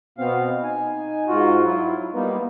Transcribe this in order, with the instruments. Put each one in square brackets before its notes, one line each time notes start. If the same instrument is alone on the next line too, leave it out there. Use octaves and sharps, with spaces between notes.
[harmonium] B2 B3 F5 [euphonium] C4
[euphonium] D#4 [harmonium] G#5
[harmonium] G#2 F4 F#4
F#3 E4 F4
[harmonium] G3 A#3 D#4 [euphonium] B3